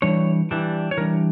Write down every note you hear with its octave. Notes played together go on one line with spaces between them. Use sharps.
E3 G3 D4 C#5
E3 G3 D4
C#5
E3 G3 D4 A#4